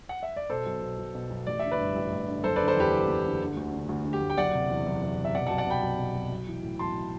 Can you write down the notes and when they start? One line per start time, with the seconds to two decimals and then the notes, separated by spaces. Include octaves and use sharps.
0.09 F#5
0.23 E5
0.36 D5
0.50 B2 A4 C5
0.66 B1
0.82 B2
0.98 B1
1.14 B2
1.30 B1
1.47 A1 D5
1.59 D3 E5
1.71 B4 D5
1.79 G2
1.95 A1
2.12 A1
2.28 D3
2.44 F#1 A4 C5
2.56 D3 B4 D5
2.68 A4 C5
2.76 E2 G4 B4
2.92 F#1
3.08 F#1
3.24 D3
3.41 D3
3.56 D2
3.72 D3
3.89 D2
4.05 D3
4.13 G4
4.21 D2
4.30 G5
4.37 F#1 D5 F#5
4.54 C3
4.70 E2
4.86 F#1
5.02 F#1
5.18 C3
5.25 E5
5.34 B2 D5 F#5
5.47 B1 F#5 A5
5.58 D5 F#5
5.67 B2 G5 B5
5.82 B1
5.98 B2
6.15 B1
6.31 B1
6.47 E3
6.63 A2
6.79 B1 A5 C6